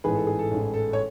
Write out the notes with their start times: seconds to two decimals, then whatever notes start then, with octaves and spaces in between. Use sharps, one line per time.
0.04 A1 G#2 E3 G#4 B4
0.15 A4
0.27 G#4
0.39 A4
0.51 A1 G#2 E3
0.74 A4
0.93 C#5